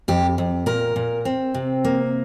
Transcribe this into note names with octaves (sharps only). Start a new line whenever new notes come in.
F2 G4
F2
A#2 A#4
A#2
C4
C3
A#3